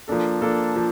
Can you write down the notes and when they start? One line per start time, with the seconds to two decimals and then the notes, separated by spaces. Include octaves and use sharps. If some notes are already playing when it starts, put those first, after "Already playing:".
0.08 F3 A#3 D4 A4
0.42 F3 A#3 D4 A4
0.76 F3